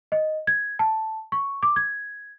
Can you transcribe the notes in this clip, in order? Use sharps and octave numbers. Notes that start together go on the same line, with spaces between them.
D#5
G#6
A5
C#6
D6
G#6